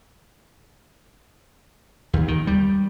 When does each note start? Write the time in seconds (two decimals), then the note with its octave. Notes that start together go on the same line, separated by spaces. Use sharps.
2.13 D#2
2.28 D#3
2.47 G3